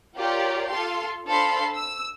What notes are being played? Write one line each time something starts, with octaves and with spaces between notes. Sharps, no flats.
F4 G4 A#4 C#5 D5
F4 A4 F5 C6
D4 A4 C5 F5 B5 C6
E6